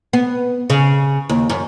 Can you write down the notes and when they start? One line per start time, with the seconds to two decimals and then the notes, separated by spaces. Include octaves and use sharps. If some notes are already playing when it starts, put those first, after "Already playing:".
0.13 B3
0.70 C#3
1.29 D#2
1.49 F#2